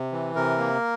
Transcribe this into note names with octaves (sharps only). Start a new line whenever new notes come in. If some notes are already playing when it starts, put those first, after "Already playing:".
Already playing: C3
E3
C3 A#4
A#3